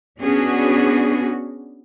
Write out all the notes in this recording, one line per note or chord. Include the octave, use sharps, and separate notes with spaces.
B3 C#4 D4 F#4 G#4